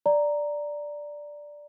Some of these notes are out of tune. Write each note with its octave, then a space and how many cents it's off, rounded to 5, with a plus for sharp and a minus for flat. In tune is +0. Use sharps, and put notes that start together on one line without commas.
D5 +0 A#5 +0